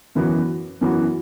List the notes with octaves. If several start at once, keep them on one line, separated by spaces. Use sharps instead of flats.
F#2 E3 B3 F#4
F#2 E3 B3 F#4